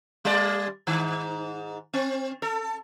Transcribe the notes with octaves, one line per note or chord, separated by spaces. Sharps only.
G3 D5
G#2 D#3
C4
A4